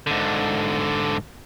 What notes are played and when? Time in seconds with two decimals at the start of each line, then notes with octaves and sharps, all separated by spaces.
0.07 G#2 D3